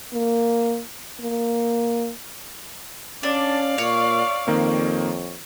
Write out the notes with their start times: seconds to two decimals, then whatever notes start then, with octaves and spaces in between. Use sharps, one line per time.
0.13 A#3
1.21 A#3
3.23 C#4 D4 D5 F5
3.78 A#2 C#5
4.47 F2 D#3 A#3 C4